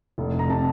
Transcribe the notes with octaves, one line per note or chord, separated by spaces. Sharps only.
F1
F1
A#5
C3 A5